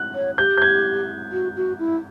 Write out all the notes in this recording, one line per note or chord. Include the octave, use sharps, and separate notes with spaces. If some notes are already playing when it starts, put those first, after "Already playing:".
Already playing: F#6
C#5
G4 G6
G6
G#6
F#4
F#4
E4